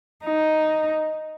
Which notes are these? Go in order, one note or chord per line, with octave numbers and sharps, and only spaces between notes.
D#4